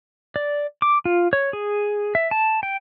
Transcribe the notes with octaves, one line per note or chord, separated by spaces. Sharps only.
D5
D6
F4
C#5
G#4
E5
A5
G5